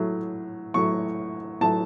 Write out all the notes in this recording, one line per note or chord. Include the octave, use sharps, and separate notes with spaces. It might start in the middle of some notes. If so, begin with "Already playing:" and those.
Already playing: A2 F#3 A3
A2 F#3 A3 C#6
A2 F#3 A3 A5